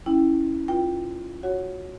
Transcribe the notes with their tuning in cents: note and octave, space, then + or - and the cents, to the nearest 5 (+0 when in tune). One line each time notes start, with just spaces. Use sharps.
C#4 +0 E4 -10 G5 +0
F4 +0 B4 -40 G5 +0
F#4 +0 C#5 +0 F#5 +0